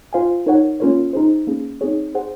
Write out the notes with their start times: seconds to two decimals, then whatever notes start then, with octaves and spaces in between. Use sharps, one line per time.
0.13 F4 C5 F5 G#5
0.46 D#4 A#4 C#5 F#5
0.80 A#3 C#4 F4 A#4 C#5
1.13 D#4 G#4 C5
1.47 A#3 C#4 G#4
1.81 C4 D#4 G#4 C#5
2.15 G#4 C5 F#5